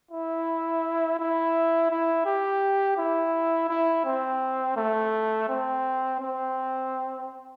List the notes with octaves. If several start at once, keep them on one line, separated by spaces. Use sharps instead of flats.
E4
E4
E4
G4
E4
E4
C4
A3
C4
C4